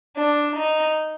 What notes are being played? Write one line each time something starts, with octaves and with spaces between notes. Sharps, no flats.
D4
D#4